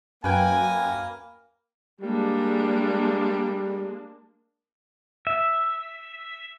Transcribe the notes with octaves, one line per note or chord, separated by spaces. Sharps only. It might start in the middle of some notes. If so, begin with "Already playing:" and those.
F#2 A#3 B4 G5 G#5
G3 G#3 A#3 D4
E5